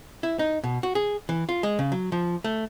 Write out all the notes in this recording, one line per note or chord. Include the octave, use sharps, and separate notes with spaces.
E4
D#4
B2
F#4
G#4
E3
F4
G#3
C#3
F#3
F3
A3